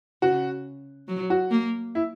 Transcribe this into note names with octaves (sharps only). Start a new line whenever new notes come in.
C#3 F#4
F#3
F#4
A#3
E4